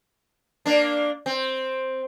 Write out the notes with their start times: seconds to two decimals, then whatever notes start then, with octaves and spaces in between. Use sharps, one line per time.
0.66 A#3 D4
1.26 C4